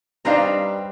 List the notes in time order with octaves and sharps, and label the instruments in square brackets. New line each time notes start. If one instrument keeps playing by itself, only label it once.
[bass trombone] G3 [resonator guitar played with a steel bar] C4 B4 F5 [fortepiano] D4 D#4 A#5